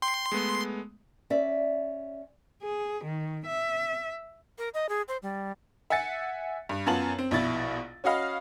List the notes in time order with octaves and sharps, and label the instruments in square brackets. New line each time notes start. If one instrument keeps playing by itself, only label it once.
[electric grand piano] G5 [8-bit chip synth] C6
[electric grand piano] G#3 A3 B3
[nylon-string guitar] C#4 D5 E5
[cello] G#4
D#3
E5
[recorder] A#4
D#5
G#4
C5
G3
[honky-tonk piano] E5 F#5 G#5 A6 C#7
G2
F#2 B3 F4 A5 F#7
C4
A#1 B2 E4 A6
C#4 F#4 D#5 F5 B5